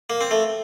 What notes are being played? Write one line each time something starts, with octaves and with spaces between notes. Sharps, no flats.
A#3
C4
A3